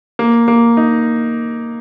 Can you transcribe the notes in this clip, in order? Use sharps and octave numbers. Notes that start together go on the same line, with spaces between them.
A#3
A#3
D#4